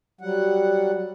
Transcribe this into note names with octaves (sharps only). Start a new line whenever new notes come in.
F#3 G3 F#5